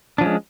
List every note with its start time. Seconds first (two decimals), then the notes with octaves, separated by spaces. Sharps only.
0.18 D4
0.21 F3
0.23 C#4
0.26 G#3